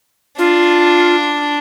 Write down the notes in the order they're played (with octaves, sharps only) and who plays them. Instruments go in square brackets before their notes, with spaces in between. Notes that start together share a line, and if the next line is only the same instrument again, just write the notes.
[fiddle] D4 [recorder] F4